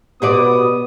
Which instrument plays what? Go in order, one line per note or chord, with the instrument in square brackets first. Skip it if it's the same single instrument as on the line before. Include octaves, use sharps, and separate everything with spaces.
[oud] B2 F#4 D5 [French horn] B3 [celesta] G4 [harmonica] D#6